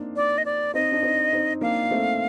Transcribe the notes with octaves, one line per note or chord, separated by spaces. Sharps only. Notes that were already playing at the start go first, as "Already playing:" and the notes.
Already playing: A#3 C4 D4 D#4
D5
D#5
D5
C4 D#4 D#5
D4
C4 D#4
C4 D#4
A#3 D4 F5
A3 C4